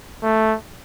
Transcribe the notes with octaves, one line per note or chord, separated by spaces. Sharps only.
A3